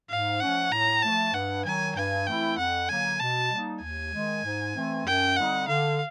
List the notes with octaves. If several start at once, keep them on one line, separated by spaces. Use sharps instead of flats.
G#2 F5
F3 A3 C#4 F#5
A2 A#5
F3 A3 A5
G2 F#5
D#3 F#3 G#5
G2 G#5
E3 A3 C4 E4 G5
F2 F#5
D3 F#3 A#3 G#5
B2 A5
G3 A#3 D#4
D#2 G#5
D#3 G#3
G#2
E3 A3 C4
F#2 G5
D3 G3 C4 D#4 F#5
D3 F5